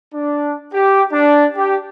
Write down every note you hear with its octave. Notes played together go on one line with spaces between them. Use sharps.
D4
G4
D4
G4